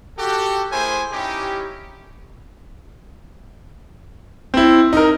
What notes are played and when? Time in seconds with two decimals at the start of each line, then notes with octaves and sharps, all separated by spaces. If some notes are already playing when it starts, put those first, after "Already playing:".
0.18 F#4 G4 A4
0.72 A3 E4 G#4 A#4 C5 G#5
1.12 C#4 D#4 E4 G4
4.54 C4 E4
4.93 D#4 A#4